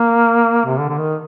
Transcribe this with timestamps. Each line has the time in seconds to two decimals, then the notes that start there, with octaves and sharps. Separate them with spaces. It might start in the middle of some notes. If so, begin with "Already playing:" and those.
Already playing: A#3
0.66 C3
0.79 D3
0.89 D3
0.98 D#3